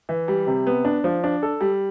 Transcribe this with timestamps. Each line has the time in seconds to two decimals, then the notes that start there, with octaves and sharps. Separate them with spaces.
0.09 E3
0.28 G3
0.47 C3
0.67 B3
0.85 D4
1.04 F3
1.24 D4
1.43 A4
1.61 G3